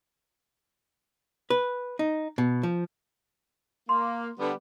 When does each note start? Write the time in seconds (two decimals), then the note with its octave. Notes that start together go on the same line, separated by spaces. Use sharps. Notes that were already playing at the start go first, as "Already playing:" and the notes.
1.50 B4
1.99 D#4
2.38 B2
2.63 F3
3.89 A#3 C6
4.38 D3 G3 B3